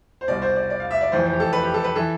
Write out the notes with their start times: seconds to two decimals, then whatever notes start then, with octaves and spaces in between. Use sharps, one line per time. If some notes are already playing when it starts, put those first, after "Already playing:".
0.21 C5
0.28 C2 B2 D5
0.42 C5
0.56 D5
0.70 D5
0.80 F5
0.91 E5
1.01 D5
1.12 F1 F2 E3 C5
1.26 C5
1.33 G4
1.40 A4
1.53 B4
1.63 G4
1.74 A4
1.84 B4
1.96 E3 A4